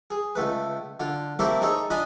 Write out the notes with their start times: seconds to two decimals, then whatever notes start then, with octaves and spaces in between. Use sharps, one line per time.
0.10 G#4
0.35 C#2 A3 B4
1.00 D3 F4
1.39 A3 A#3 C4 E4 G4 A4
1.61 D#4 G#4 A4 C#5
1.90 D4 F4 D#5 G#5 B5